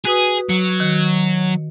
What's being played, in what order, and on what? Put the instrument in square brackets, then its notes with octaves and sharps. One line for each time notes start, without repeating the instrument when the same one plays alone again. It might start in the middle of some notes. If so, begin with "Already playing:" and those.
[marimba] F#4 B4 D#6 [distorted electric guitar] G#4
[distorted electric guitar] F#3
[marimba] D#3